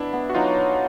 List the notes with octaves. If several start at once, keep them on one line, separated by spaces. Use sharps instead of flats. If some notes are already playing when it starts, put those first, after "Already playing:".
Already playing: B2 D4 E4
B3
F#4
F#3 D#4 F4